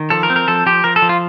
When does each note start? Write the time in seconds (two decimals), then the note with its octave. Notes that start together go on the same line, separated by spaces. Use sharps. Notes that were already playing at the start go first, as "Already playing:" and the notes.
Already playing: D#3
0.10 F3 A4
0.23 A#4
0.30 C4
0.36 A#4
0.48 F3 A4
0.66 F3 G4
0.84 F3 A#4
0.96 A4
1.02 F3
1.09 F4